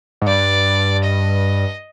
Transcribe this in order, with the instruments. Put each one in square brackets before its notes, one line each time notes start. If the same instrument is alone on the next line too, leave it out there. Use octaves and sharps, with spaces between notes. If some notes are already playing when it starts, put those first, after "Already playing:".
[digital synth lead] G#2
[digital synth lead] G2 [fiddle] D5
[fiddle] D#5